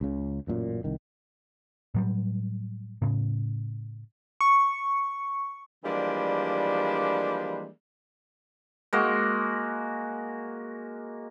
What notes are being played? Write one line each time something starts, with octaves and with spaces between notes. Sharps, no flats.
C#2 C#3
A1 F#2 A#2
C2 D#3
A2 F#3 G3
A2 C#3
C#6
E3 F3 G3 G#3 A#3 D4
G#3 A#3 F#4